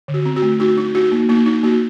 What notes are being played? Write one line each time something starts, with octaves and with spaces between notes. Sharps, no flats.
D3
F#4
C4
F#4
A3
D#4 F#4
D#4
D#4 F#4
A#3
A#3 D#4
D#4
A#3 F#4